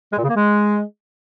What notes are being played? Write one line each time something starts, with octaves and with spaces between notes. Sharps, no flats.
G#3
A#2
C#3
A#3
G#3